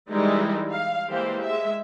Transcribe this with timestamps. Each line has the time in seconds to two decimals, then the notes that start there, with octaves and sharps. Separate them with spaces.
0.10 E3 G3 G#3 D#4 E4 A#4
0.71 F5
1.09 E3 G#3 A#3 G4 C5
1.41 G#3 E5